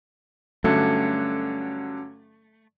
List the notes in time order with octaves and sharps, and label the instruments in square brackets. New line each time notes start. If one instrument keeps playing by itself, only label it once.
[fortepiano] G2 D3 F#3 [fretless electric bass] A3 [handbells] C#4 G#6 C#7